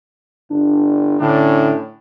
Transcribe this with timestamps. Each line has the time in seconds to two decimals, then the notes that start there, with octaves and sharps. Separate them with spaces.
0.50 G1 D4
1.20 A2 D3 C#4 D4